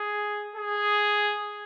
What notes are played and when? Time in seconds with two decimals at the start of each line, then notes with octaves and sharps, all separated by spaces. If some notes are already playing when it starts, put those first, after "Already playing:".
Already playing: G#4
0.56 G#4